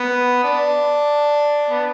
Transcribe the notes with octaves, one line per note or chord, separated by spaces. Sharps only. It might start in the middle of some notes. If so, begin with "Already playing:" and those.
Already playing: B3
D4
B3